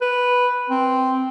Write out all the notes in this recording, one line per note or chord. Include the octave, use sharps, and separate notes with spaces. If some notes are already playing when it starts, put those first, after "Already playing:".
B4
C4